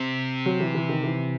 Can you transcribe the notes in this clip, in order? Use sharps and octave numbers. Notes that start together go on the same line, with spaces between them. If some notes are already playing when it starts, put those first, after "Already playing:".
Already playing: C3 C4
F#3
E3
E3
D#3
E3